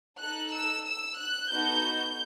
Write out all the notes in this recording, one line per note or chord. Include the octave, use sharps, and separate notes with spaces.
D#4 A4 F#6
E6
E6
F#6
B3 D#4 F#4 A4 G6